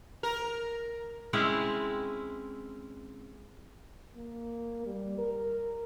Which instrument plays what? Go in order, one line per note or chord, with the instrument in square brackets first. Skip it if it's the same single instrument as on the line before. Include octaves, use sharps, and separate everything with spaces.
[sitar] A#4
[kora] G#3 C4 C#4 E4
[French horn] A#3
G3
A#4